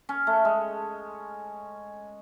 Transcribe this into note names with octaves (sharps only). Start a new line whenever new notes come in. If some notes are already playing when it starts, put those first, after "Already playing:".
C#4
A3
G#3